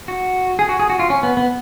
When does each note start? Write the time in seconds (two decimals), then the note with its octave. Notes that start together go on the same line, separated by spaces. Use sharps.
0.08 F#4
0.59 G#4
0.69 F#4
0.79 G#4
0.90 F#4
0.99 F4
1.10 C#4
1.23 B3
1.37 B3